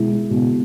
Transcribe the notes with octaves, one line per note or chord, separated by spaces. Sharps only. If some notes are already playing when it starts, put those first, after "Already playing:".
Already playing: B2 G#3 E4
B2